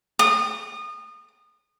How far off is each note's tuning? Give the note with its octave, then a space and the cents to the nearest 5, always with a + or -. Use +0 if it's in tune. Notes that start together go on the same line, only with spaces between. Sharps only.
D#6 -30